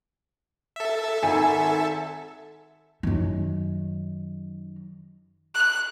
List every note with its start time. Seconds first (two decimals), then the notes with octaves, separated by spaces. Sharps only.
0.76 A4 E5
1.22 G#1 G#5
3.03 F#2 D#3
5.55 F#6